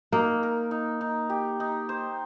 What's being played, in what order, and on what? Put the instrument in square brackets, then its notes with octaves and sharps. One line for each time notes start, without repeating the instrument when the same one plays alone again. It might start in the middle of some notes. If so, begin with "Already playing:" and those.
[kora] A#3 [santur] D#4
[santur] A#4
D#4
D#4
G4
D#4
C5